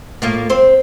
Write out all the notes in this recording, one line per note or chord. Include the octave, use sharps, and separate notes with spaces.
A2 A#3 F4
C4 C5